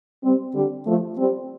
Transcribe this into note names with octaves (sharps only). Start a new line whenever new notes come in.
G3 C4
D3 G3
F3 A3
G3 C4